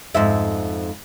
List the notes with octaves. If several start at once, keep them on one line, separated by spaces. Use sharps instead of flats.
F2 G#2 E5